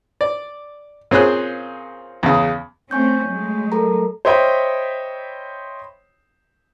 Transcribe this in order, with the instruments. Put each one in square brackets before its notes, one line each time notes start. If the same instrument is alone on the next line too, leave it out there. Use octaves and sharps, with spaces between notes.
[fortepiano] D5
A#2 C4 C#4 G#4 C5 F#6
E2 C#3
[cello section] A3 C4 C#4 [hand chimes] G#5 C#6 G6
[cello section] F#3 G#3 A3
[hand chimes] A4 A#4 A#5
[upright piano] C5 C#5 D#5 E5 G5 B5